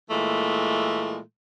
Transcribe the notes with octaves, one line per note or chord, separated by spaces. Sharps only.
A#2 E3 G#3 A3